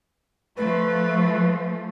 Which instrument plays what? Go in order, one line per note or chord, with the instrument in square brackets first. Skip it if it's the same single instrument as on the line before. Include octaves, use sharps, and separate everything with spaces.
[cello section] F3 A3 [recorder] B4